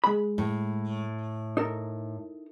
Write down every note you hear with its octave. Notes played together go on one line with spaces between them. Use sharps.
G#3 B5
A2
D#4 A4 A#4